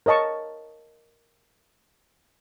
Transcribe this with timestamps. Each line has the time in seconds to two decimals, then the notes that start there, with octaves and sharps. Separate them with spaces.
0.06 A#4 C#5 D#5 A5 C#6